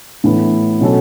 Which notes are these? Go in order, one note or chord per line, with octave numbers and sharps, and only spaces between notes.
A2 E3 B3
B2 F#3 C#4 F#4 A4